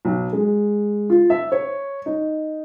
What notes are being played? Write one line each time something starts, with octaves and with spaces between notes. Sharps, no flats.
B1
G#3
F4
E5
C#5
D#4